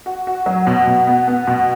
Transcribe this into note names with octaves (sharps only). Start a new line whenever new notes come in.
F#4
F#4
F#3
B2
B2
B3
B3
B2